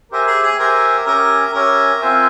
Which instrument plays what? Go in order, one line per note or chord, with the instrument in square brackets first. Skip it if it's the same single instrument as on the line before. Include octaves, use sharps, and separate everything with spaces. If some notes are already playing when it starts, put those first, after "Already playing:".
[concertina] G4 C5 E5 G#5 [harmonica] A#4
[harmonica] G#4
G#4
[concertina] G4 C5 E5 G#5 [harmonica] A#4
[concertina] C#4 G4 C#5 E5 G#5 [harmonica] A#4
[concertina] C#4 G4 C#5 E5 G#5 [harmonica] A#4
[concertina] C4 F4 C5 E5 G#5